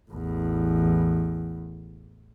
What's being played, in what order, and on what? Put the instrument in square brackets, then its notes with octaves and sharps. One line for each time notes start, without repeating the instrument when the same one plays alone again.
[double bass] A1 E2